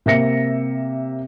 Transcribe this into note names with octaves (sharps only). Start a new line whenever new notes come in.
C3 A#3 E5 A#6 C#7